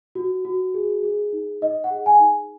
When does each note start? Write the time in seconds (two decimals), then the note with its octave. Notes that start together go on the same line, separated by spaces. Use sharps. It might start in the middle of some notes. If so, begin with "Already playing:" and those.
0.15 F#4
0.45 F#4
0.74 G#4
1.03 G#4
1.33 D#4
1.61 D#4 D#5
1.84 F#5
1.90 G#4
2.06 G#5
2.20 D#4